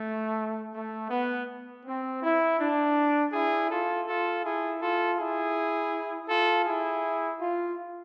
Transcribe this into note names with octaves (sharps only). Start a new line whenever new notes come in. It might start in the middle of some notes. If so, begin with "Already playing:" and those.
Already playing: A3
A3
B3
C4
E4
D4
E4 G#4
F4 A4
F4 A4
E4 G#4
F4 A4
E4 G#4
F4 A4
E4 G#4
F4